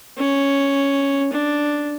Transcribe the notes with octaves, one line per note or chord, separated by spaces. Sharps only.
C#4
D4